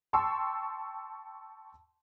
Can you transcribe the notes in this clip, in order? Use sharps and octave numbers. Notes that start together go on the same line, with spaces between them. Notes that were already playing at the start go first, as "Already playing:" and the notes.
G5 A5 C6 C#6 E6